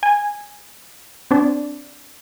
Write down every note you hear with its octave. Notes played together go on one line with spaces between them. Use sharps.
G#5
C4 D4